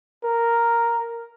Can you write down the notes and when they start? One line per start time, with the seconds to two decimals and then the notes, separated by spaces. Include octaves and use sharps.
0.24 A#4